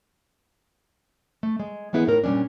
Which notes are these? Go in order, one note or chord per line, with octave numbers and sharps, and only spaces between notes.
A3
G#3
E3 G#3 B3 E4 G#4 B4
A2 D#4 A#4
A#2 G3 A3 C#4 D4